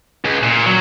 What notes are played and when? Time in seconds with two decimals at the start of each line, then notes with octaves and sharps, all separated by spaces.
0.25 C#2
0.43 A#2
0.66 F#3